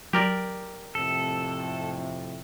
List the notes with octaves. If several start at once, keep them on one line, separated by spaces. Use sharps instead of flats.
F#3 G4 A#4 D5
F2 A2 C3 A4